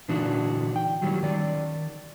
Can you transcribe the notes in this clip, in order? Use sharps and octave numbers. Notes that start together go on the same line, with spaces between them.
A#2 D3 E3 D4 D#4 F#4
G5
D#3 F#3 G3
D#3 D5